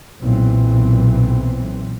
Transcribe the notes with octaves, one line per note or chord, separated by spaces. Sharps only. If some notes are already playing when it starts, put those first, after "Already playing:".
B1 A#2 E3 C4